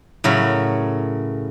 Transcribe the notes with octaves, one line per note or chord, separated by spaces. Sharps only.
A2 C#3 F#3 A#4 C#5 B5